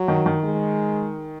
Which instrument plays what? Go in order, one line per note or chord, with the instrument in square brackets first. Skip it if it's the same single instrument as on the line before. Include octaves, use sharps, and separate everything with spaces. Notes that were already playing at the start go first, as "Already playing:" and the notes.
Already playing: [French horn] F#3
[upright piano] D#3
D#3
[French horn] G#3